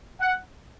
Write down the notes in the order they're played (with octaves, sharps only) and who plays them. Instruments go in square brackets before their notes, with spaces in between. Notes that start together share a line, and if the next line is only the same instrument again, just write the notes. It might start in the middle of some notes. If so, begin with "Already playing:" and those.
[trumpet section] F#5